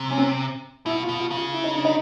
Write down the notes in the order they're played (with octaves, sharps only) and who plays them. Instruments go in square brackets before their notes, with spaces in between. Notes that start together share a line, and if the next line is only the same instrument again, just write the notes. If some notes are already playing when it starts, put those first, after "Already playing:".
Already playing: [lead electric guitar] C3
[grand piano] C#4
C4
[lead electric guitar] B2 [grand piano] E4
[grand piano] F4
[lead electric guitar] B2
[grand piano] F4
[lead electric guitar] C#3
[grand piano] F4
E4
D#4
D4
D#4